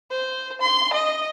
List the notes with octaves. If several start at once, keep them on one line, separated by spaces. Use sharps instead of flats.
C5
C6
D#5